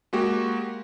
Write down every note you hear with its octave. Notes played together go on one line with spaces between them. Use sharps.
G#3 A#3 F#4 G4